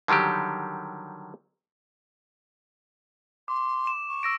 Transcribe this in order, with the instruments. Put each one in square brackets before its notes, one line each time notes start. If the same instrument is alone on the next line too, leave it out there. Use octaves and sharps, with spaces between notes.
[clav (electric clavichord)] D3 D#3 F#3 G3 G4
[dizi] C6 [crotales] D6
[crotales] E7
[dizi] C#6
[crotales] E6 A#6 D7